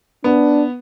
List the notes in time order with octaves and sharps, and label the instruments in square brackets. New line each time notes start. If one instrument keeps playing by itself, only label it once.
[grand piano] B3 [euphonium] D4